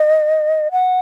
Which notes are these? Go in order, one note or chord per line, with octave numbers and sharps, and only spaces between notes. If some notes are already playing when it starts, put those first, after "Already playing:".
Already playing: D#5
F#5